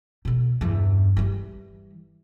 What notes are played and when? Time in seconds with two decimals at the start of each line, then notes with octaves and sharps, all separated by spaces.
0.25 B2 D3
0.61 E2 G2
1.17 E3 G3